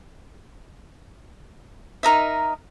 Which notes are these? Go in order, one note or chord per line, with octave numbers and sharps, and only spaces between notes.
D#4 A#4 D#5 E5